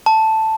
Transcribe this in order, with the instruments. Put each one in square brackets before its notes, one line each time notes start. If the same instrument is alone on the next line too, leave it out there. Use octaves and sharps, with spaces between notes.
[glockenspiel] A5